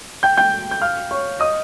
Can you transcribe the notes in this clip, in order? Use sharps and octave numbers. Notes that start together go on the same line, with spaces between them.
G5 G6
G5 G6
G6
F5 F6
C#5 C#6
D#5 D#6